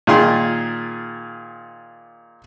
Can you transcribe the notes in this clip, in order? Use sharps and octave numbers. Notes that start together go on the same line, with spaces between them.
A#2 D#3 F4 G#4 C6